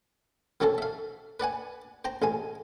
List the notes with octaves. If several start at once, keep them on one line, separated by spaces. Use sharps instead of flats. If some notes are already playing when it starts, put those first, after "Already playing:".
D#3 F#3 C#4 A4 C5
E5 F5
B4 D5 F#5 G#5
C5 G5 A#5
A1 G#3 G#5